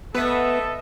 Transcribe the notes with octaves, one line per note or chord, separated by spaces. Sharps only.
A3 B3 A4 B4 D#5 E5